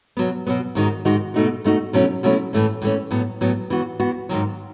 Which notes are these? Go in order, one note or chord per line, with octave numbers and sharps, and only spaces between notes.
B2 F#3 B3
B2 F#3 B3
G#2 D#3 G#3 D#4 F#4
G#2 D#3 G#3 D#4 F#4
B2 A3 D#4 F#4
B2 A3 D#4 F#4
B2 F#3 A3 C#4 E4
B2 F#3 A3 C#4 E4
A2 E3 A3 C#4
A2 E3 A3 C#4
A2 F#3 B3
A2 F#3 B3
E3 B3 F#4
E3 B3 F#4
G#2 D#3 F#3